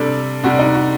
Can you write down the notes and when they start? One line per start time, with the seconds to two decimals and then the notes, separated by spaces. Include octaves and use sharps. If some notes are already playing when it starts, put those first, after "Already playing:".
Already playing: C3 G3 D4 A4
0.44 C3 G3 D4 F#4
0.59 D#4
0.75 F#4